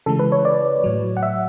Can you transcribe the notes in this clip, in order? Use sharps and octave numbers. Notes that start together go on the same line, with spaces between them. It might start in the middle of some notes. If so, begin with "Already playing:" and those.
C#3 E3 G#3 A4
B4
C#5
D5
A2 F#3
F#5
E5